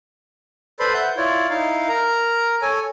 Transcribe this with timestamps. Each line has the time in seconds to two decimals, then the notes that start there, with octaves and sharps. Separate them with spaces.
0.80 A4 B4 C5 D5 B5 C6
0.94 E5 F#5 G6
1.17 E4 F4 C#5 D5
1.50 D#4 E4 F5
1.89 A#4 A#5
2.62 A4 C#5 G#5